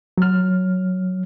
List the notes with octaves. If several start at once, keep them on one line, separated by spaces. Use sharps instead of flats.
F#3 F6